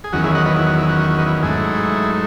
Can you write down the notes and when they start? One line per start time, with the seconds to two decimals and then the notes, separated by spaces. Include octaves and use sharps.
0.04 G#4
0.13 E2 D#3 F#3 C#4 F#4
0.24 E4 G#4
0.35 D#5 F#5
0.46 B4 D#5
0.56 E4
0.67 F#4
0.78 E4
0.89 F#4
0.99 F#4
1.10 F#4
1.18 B4 D#5
1.26 E4
1.43 G#2 F#3 A3 D#4 E4 G#4